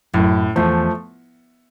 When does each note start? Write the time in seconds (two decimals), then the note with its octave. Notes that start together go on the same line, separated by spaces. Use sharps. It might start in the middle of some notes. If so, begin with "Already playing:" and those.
0.14 F#2 A2
0.56 E2 F3 A3